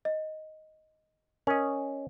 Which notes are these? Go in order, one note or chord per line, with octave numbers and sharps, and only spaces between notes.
D#5
C#4 A#4 D#5